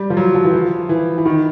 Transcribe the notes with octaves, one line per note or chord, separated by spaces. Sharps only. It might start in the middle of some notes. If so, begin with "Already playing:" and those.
Already playing: G3
F3
F#3
F3
E3
F3
E3
E3
D#3